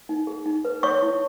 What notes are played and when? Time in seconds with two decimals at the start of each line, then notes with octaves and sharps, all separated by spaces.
0.09 D#4
0.27 G#4
0.46 D#4
0.65 B4
0.83 C#5 C#6
1.02 E4